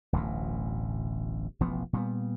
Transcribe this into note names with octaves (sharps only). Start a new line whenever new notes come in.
D1 A1 D2 B2
E1 A1 F3 B3
A#2 G3 B3